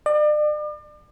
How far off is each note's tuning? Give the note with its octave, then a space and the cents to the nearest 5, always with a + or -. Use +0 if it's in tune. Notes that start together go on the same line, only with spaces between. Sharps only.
D5 +40